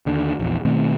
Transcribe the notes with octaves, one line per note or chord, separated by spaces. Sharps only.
D#2 D3
A#1 E2
B2 D#3 A3 C4